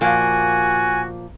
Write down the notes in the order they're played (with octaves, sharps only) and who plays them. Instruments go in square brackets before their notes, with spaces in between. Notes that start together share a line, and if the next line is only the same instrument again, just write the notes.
[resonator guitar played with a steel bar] A#2 F3 A#3 [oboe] F#4 [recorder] G#5